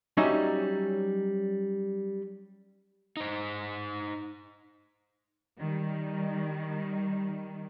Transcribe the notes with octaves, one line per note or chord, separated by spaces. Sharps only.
F#3 G3 C#4 D#4 D5 E5
D#4 C5
D#3 G3